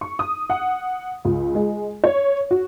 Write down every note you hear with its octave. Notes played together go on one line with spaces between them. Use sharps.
C#6
D#6
F#5
C#2
G#3
C#5
F#4